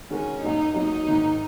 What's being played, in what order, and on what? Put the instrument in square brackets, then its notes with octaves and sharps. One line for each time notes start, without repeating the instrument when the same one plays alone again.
[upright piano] D#3 G#3 F#4 A#4 [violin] C#4
[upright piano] F#2 F#3 A#3 [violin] D#4
[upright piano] F#2 F#3 A#3 [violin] D#4
[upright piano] G#2 D#3 A#3